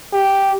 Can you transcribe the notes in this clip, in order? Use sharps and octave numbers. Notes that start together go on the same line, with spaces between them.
G4